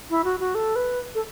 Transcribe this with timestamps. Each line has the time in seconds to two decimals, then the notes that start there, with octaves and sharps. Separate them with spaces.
0.10 E4
0.24 F#4
0.40 F#4
0.55 A4
0.76 B4
1.15 A4